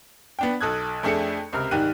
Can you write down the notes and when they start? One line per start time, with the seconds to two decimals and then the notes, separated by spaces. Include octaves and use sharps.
0.39 B3 D4 G5
0.61 B1 A4 D#6 F#6 G#6
1.03 F2 A3 D4 G#4 A4 C#7
1.53 C#2 C3 A#4 F6
1.71 C2 G#2 D#3 G4 F#6 D#7